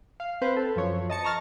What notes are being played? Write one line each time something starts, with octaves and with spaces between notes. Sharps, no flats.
F5
C4 B4 C5
A4
F#2 F3 C#5
D#5 A5 C#7
A5 A#5 C#6 F6 A6